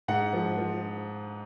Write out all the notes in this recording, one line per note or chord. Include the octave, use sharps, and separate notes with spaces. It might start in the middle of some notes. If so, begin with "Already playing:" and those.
G#2 F#5
F3
F3